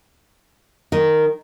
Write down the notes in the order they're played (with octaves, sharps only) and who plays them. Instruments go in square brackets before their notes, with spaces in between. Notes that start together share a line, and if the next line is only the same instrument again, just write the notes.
[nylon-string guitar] D#3